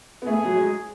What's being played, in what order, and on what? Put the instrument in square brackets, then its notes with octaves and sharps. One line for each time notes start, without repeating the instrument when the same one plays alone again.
[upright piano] B3
[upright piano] A3 [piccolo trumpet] G#4
[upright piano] F#3
G#3